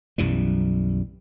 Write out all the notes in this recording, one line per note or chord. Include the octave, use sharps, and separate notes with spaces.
B1 F#2 E3 G3